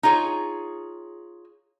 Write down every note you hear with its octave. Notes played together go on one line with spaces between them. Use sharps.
D#4 F4 G#4 C#5